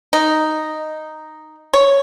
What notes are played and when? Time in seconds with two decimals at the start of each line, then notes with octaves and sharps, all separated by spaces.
0.13 D#4
1.74 C#5